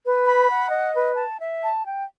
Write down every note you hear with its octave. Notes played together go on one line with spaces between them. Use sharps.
B4
B5
F#5
D#5
B4
A5
E5
A5
G5